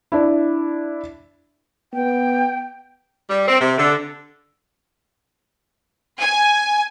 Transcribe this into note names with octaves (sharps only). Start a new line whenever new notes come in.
D4 E4
B3 G5
G3
C4
C3
D3
G#5